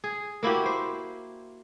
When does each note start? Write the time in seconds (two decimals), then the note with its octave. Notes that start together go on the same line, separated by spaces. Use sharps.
0.04 G#4
0.43 A#3 E4 F#4 G4
0.66 C5